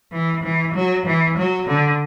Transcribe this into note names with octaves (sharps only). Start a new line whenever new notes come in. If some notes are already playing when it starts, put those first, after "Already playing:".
E3
E3
F#3
E3
F#3
D3